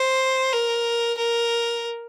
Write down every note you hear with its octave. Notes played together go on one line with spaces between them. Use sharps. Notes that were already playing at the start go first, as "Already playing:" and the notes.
Already playing: C5
A#4
A#4